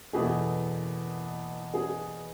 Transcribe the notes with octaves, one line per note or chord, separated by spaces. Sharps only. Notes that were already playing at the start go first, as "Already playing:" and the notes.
F#1 E2 B2 A3 G#4
G#4